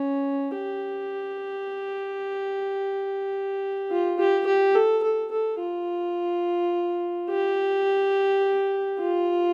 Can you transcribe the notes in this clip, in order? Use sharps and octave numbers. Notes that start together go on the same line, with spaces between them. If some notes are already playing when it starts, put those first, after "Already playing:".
Already playing: C#4
G4
F4
G4
G4
A4
A4
A4
F4
G4
F4